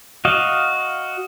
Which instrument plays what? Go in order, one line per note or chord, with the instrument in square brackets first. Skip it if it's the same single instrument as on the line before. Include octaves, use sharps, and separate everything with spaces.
[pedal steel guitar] F#4 D#5 F5